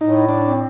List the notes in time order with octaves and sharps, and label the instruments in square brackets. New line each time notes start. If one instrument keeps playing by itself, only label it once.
[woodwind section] A2 [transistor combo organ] D#4
[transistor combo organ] D4
[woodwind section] C4